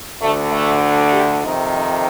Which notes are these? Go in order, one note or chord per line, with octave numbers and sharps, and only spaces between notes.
D2 D3 A3
A3
G4
F2 C3 D#3 D#4
D#4